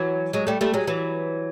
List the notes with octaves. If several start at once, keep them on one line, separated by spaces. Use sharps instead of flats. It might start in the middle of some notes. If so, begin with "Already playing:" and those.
Already playing: E3 F#3
F#3 G#3
G3 A3
G3 A3
F#3 G#3
E3 F#3